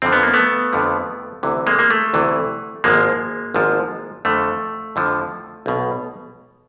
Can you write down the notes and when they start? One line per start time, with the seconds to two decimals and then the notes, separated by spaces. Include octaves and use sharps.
0.02 F2 D3 F3 C4
0.13 B3
0.23 A#3
0.34 A3 B3
0.73 F2 D3 F3
1.43 D2 C3 E3
1.67 G#3 A#3
1.79 A#3
1.90 A3
2.13 D2 C3 E3
2.84 G#1 G#2 F3 G#3 A#3
3.54 G#1 G#2 F3
4.25 F2 D3 F3 A3
4.96 F2 D3 F3
5.66 B1 B2